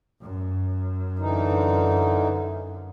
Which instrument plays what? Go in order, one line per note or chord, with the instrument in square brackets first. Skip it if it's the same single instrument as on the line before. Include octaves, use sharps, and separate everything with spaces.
[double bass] F#2
[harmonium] D3 E3 D#4